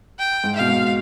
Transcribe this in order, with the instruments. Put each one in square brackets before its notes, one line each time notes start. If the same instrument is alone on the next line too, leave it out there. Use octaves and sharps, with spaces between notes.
[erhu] G5
[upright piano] G#2
[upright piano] B2 [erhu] F5
[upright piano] G#2